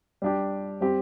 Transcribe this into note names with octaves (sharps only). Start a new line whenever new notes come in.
G3 D4 G4
G3 C4 G4